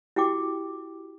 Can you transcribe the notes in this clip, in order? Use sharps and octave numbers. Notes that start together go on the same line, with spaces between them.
E4 F#4 G4 G5 D6